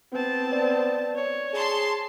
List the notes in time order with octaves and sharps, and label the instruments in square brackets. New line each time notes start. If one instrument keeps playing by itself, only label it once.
[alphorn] B3 [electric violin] C4 A5
[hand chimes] C5 D5
[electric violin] C#5
[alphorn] G#4 [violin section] A5 C6